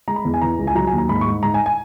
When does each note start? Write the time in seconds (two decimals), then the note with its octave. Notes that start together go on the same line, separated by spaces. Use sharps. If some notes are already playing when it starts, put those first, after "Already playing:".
0.08 G#3 A#5
0.16 B5
0.25 E2
0.34 G#5
0.41 E3 A#5
0.59 C#2
0.67 G#5
0.75 F#3 A#5
0.87 G#5
0.93 D#2
0.98 A#5
1.09 G#2 B5
1.21 G#2 C#6
1.43 G#2 A#5
1.54 G#5
1.66 G#5